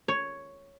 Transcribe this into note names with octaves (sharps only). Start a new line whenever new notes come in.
C#5